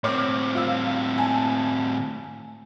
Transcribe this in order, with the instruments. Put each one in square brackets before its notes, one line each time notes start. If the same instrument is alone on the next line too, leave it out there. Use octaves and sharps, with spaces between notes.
[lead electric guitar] A2 C4 [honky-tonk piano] C#5 D6 F6
[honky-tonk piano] F4 F5 E6
G#5 A5